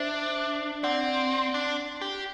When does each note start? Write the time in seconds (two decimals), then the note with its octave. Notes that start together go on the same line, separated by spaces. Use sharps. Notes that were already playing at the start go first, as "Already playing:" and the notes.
Already playing: D4 C5 E5
0.83 C4 D5 F#5
1.54 D4
2.01 G4